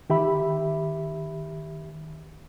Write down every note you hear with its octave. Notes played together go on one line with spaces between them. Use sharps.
D#3 G4 E5 B5